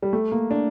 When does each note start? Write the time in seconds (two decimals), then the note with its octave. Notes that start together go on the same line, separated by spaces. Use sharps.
0.02 G3
0.13 A3
0.32 A#3
0.51 D4